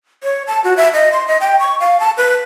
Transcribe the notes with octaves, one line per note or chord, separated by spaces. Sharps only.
C#5
A5
F#4
E5
D#5
C6
D#5
G5
C#6
F5
A5
B4